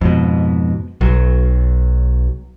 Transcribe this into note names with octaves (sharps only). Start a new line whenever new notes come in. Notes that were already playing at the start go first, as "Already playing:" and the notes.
F2 G#2 B2
B1 F#3